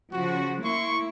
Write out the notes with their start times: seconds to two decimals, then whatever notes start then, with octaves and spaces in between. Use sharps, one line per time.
0.13 C#3 F3 F#4
0.64 A#3 E4 C6 C#6